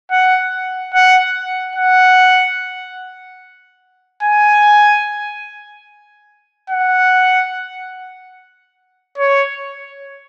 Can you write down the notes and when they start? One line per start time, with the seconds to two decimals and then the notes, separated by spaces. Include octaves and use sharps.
0.11 F#5
0.94 F#5
1.76 F#5
4.23 G#5
6.70 F#5
9.18 C#5